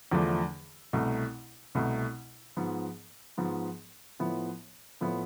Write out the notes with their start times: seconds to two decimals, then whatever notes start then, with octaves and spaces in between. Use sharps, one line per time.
0.11 E2 D3 F3 A3 D4
0.93 C2 B2 A3
1.75 C2 B2 A3
2.57 G#2 F3 B3
3.37 G#2 F3 B3
4.19 A2 F3 B3 E4
5.01 A2 F3 B3 E4